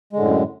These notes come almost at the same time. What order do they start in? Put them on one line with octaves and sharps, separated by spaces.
G#3 D3 A2 F#2